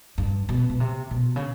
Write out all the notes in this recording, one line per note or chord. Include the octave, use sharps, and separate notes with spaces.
G2
B2
B2
C3
B2
C#3